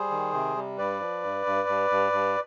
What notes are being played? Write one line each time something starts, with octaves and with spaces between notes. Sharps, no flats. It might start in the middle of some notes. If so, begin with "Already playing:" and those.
Already playing: G3 G#4 C5
D#3
C3
G3
G2 B4 D5
F3
G2
G2
G2
G2
G2